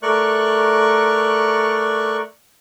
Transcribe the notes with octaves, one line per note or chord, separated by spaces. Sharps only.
A3 A#4 D5 C#6 F#6